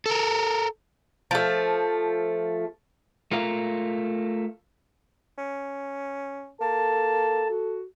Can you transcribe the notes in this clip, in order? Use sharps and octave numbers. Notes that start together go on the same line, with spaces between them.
A4 A#4
F3 A3
A3 F4 A#4 F5
C#4
A#3 A4 A5
F#4